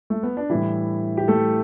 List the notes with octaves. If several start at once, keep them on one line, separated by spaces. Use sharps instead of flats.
A3
B3
D4
A2 E3 G3 E4
G4
A3 A4